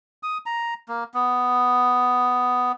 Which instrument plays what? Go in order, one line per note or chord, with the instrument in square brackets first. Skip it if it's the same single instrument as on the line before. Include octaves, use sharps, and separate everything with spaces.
[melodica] D#6
A#5
A#3
B3